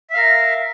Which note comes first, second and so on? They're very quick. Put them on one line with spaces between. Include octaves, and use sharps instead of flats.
E5 F5 A#4